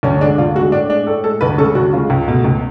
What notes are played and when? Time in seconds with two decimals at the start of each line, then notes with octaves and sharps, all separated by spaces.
0.03 D2 C#4
0.21 D3 G#3 D4
0.38 D2 F4
0.55 G#3 F#4
0.59 D3
0.72 A2 D4
0.90 G#3 D4
1.07 A2 A4
1.24 G#3 A4
1.41 D2 B4
1.58 C#3 G#3 A4
1.75 D2 F#4
1.93 C#3 G#3 F4
2.10 C#2
2.28 B2 A3
2.44 C#2